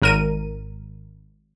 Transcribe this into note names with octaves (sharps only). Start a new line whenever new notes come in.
G#1 A#4 D#7